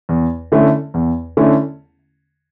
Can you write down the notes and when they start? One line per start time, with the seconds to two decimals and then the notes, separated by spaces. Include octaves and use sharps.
0.09 E2
0.52 D3 A3 C#4 E4
0.94 E2
1.37 D3 A3 C#4 E4